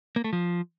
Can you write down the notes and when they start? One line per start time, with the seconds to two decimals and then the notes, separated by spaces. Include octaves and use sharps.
0.16 A#3
0.24 A3
0.33 F3